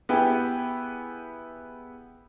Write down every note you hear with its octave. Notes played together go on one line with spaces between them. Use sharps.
B3 E4 G4 G#4 B4 G5